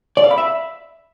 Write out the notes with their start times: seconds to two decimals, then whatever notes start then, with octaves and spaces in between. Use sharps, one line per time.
0.17 D5
0.24 F5
0.31 B5
0.38 E5